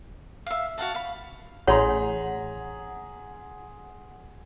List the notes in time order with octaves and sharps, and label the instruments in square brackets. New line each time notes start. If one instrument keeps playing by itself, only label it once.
[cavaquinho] E5 F5
F#4 F5 F#5 A5
F5 B5
[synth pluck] A1 [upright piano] G#4 A#5 C6 [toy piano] C#5 [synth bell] F#5